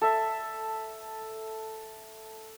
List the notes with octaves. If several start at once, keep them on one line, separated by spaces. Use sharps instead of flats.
A4 E5